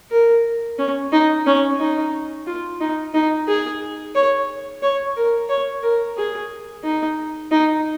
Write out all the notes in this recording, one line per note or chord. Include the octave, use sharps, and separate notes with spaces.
A#4
C#4
D#4
C#4
D#4
F4
D#4
D#4
G#4
C#5
C#5
A#4
C#5
A#4
G#4
D#4
D#4